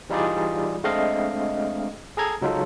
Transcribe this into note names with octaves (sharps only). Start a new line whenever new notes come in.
E3 G3 D#4 F4 G#4 D5
G#3 A3 C4 D4 D#5 F5
G#4 A4 A#5 G#6
C#2 F#3 G#3 D#4 F4 A4